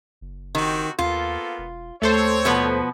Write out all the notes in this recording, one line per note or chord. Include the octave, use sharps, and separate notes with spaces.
F#1
D#3 C4 F#4 G4
D#2 A#3 B3 F4 A4
E1
D#2 A3 C4 A4 C5 C#5
B2 F3 B3